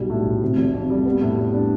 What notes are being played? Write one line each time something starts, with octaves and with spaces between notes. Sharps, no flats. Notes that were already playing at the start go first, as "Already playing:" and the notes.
Already playing: B1 G3
A2
B1
C3
F1
F2
G3
B3
A2
G3
D4